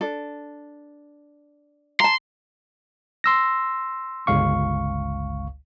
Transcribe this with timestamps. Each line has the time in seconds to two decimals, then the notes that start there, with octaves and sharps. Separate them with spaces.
0.01 D4 A4
2.00 A5 A#5 C6
3.24 C6 E6 A#6
4.27 G1 C#2 F5 C#6